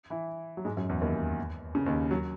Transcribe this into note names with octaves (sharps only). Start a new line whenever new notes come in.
E3 E4
F#3
G#2 G#3
F#2 F#3
E2 E3
D#2 D#3
C#3
D#2 D#3
F#3